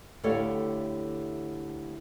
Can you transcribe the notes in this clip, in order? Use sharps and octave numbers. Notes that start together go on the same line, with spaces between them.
D2 A2 G4 A4 C#5 F5